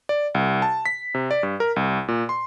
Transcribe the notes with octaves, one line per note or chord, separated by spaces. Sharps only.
D5
C2
A5
B6
C3
D5
G2
A#4
C2
A#2
C6